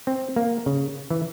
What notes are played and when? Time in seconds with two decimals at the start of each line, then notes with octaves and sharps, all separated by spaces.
0.07 C4
0.36 A#3
0.66 C#3
1.10 E3